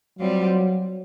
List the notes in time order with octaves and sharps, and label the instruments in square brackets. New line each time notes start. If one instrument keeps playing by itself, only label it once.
[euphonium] F#3 [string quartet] G3 C4 F4